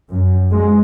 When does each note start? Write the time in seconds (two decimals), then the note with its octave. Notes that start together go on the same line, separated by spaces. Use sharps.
0.10 F#2
0.50 G#3